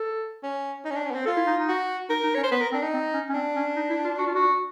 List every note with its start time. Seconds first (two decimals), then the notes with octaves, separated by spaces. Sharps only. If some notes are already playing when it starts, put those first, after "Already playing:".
Already playing: A4
0.43 C#4
0.85 D#4
0.90 C#4
0.95 D4
1.05 C#4
1.11 B3
1.15 C4
1.25 F4 A4
1.36 E4
1.47 D#4
1.57 D#4
1.68 F#4
2.09 D#4 A#4
2.23 D#4
2.35 C#4 C#5
2.43 C5
2.51 B3 B4
2.61 A#4
2.72 C4 D4
2.82 D#4
2.93 C4
3.13 C#4
3.30 C#4
3.34 C4 D4
3.56 C#4
3.76 D#4
3.90 E4
4.04 F4
4.18 F#4
4.26 F4
4.35 F#4